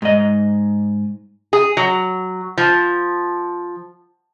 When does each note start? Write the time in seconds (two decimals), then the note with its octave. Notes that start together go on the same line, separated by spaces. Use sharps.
0.02 G#2 D#5
1.53 G#4
1.77 F#3
2.58 F3